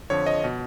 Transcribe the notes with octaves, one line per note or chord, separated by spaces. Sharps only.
F2 D3 F3 C#5
D#5
B2